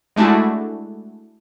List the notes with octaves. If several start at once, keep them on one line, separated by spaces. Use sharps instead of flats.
G#3 A3 D4 E4 F#4